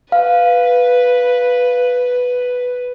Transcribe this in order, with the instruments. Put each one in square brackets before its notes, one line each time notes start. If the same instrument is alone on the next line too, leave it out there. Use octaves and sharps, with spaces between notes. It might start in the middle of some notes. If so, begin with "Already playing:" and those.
[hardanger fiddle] B4 [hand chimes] F5